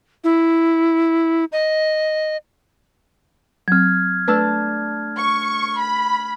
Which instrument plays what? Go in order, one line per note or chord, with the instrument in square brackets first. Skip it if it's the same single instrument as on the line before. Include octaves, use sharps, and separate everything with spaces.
[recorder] E4
D#5
[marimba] F#3 C4 [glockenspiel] F6 G#6
[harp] A3 D4 A5 [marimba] B4 E6
[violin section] C#6
B5